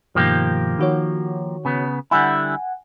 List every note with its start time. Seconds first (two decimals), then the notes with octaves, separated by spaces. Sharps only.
0.15 G2 B2 D#3 F3 A#3 G4
0.79 D#3 F#4 C#5
1.65 C#3 B3
2.11 D3 G3 E4 F#5 G#5